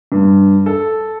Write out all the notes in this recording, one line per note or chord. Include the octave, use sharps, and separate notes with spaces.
G2
A4